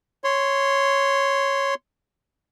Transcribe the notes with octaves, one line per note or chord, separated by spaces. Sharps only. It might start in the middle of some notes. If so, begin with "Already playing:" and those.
C#5 C6